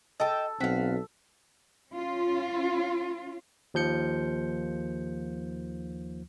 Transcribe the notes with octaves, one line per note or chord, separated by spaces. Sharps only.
A4 D#5 G5 A5
B1 C4 F#4 F5 B6
C#4 F4
D#2 F3 G6 C#7